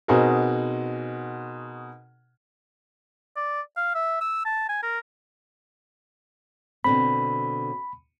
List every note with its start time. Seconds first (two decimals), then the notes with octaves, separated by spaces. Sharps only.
0.08 B2 C4 D#4 F#4 G#4 A#4
3.36 D5
3.77 F5
3.95 E5
4.21 E6
4.45 A5
4.69 G#5
4.83 A#4
6.84 B2 D3 C4 B5